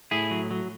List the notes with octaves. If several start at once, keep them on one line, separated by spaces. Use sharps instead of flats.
A2 E4 G#4
F#3
F#3